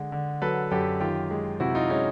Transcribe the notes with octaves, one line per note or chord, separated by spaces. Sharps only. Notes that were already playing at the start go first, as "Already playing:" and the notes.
Already playing: D3 G#3
D3
F#3 A4 B4
F#2 G4 A4
D#3 F4 G4
G#3
C3 E4 F#4
D#4 F4
G#3 C#4 D#4